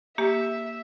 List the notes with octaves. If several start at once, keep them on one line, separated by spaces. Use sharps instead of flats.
A#3 G4 E5